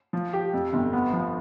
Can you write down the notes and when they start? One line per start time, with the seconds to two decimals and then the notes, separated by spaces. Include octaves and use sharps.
0.13 F3
0.33 G4
0.53 F2
0.73 G1
0.93 B3
1.13 F3